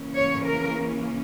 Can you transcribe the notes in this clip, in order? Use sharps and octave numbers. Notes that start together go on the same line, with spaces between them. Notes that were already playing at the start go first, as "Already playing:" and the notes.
Already playing: C#3 E3 A#3 C#4
C#5
A#4